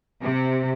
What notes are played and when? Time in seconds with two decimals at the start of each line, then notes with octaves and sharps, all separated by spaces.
0.23 C3